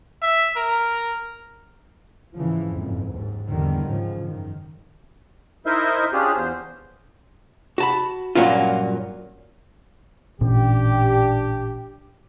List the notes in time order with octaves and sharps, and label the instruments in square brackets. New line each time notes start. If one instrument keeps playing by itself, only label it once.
[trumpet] E5
A#4
[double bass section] G#2 C#3 E3 F3
F#1 F2 G#2
D#2 G#2
E2 D3 D#3 G3
G#2 C#3 F3
F#2 D#3
[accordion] D#4 E4 A#4 C5 D#5 E5
C#4 D4 F4 G4 G#4
E2 C5
[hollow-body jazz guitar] F#4 A5 B5
G2 A#2 F#3 A#3 C#4 F4
[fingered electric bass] A1 A#2 C#4 [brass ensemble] D4 G4